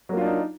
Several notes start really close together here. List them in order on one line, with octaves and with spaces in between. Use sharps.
F#3 A#3 F4 D4 D#4